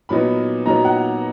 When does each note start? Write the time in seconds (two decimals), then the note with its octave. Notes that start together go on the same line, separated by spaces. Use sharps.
0.09 A#2 F#3 B3 D#4 B5
0.66 A#2 F#3 B3 D#4 A#5
0.85 F#5